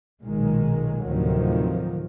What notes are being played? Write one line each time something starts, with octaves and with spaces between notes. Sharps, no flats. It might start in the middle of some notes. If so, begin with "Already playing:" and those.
B1 A#2 D#3 G#3
D2 A2 C3 D#3 F3 F#3